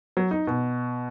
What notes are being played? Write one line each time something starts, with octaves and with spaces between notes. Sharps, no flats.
F#3
D#4
B2